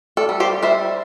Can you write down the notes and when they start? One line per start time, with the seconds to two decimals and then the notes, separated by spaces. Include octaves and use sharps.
0.17 A4 D5
0.29 G3
0.40 G4 C5
0.63 G3 C5 E5